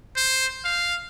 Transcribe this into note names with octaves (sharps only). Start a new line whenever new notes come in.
C5
F5